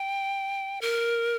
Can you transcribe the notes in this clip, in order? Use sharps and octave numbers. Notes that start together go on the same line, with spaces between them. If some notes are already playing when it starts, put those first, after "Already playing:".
Already playing: G5
A#4